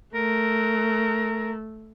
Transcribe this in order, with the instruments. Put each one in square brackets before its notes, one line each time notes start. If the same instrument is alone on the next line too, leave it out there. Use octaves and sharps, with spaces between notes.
[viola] A3 [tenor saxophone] A#4